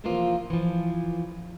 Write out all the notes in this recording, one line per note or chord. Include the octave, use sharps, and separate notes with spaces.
C3 E3 F3 A#3 F4
E3 F3